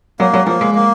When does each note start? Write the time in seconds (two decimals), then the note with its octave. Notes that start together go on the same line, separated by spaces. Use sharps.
0.20 F#3 A#3
0.33 F#3
0.46 F3 A#3
0.61 G#3
0.75 A#3